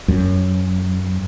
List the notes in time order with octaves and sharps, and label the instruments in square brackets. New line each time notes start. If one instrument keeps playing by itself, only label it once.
[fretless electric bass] F#2